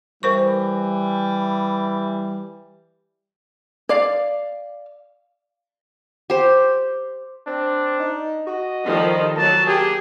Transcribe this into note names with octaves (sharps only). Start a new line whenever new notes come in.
E3 G3 A#4 C5 C#6
D5 F5
G4 C5
C4 D4
D#4
F#4 D#5
D#3 F3 G3 A4
F#3 A#3 A5
A#3 G4 G#4